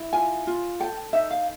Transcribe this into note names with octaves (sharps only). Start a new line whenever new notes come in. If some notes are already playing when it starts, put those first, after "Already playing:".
Already playing: E4
F4 G#5
F4
A4 G5
D#4 E5
F5